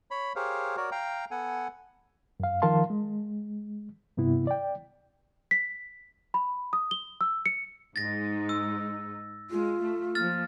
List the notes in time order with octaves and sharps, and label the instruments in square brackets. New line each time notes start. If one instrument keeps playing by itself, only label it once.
[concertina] C#5 B5
G4 G#4 A#4 C5 C#5 F5
F#4 A#4 C#5 D5
F5 G5 A#5
B3 A4 F#5 G#5
[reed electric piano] F#2 F5
D#3 F3 A#4 F5 A5 C6
G#3
G2 C3 B3 E4
D5 G5
[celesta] B6
B5
D#6
G7
E6
C#7
[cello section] G#2 G#3 D#4 [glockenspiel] A6 A#6
[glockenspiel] E6
[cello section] G#3 [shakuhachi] F4
[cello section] A3
[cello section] F3 A#3 [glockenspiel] F6 A6